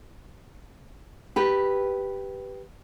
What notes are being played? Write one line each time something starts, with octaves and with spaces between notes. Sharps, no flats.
G4 B4